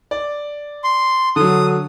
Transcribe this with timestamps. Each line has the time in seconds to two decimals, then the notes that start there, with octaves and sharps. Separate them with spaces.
0.11 D5
0.84 C6
1.36 D3 F#3 D#6